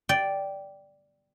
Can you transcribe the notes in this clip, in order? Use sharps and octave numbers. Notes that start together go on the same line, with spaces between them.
D5 G5